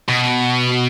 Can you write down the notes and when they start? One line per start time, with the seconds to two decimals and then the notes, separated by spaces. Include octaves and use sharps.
0.08 B2